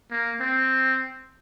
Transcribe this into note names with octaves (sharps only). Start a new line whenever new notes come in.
A#3
C4